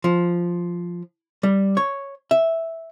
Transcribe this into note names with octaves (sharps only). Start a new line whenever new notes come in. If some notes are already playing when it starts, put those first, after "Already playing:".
F3
G3
C#5
E5